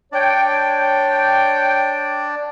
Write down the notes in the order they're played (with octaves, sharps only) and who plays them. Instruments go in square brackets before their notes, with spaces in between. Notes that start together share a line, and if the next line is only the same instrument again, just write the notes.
[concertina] D4 D5 [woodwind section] C#5 G5